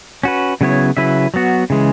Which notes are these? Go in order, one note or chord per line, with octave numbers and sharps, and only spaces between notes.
C#4 F#4 B4
C#3 F#3 B3 E4 C#5
C#3 F#3 E4 B4 E5
F#3 B3 F#4
C#3 E3 G#3